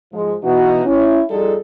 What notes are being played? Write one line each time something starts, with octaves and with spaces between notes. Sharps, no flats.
G#2 F3 G#3
B2 E3 D#4 F#4
C#4 E4
F2 G3 D#4 F4 G#4 A4